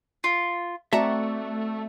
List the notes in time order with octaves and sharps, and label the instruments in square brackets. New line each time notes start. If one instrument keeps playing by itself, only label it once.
[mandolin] F4
[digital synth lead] A3 [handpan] C4 F#4 D5 [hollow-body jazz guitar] E5 A5 A#5 [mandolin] F#5